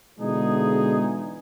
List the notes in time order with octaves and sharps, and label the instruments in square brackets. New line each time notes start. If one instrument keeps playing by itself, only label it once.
[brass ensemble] B2 D3 E3 G#3 D#4 G#4